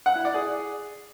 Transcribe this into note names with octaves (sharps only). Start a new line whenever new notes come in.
F#5
E4
D5
G#4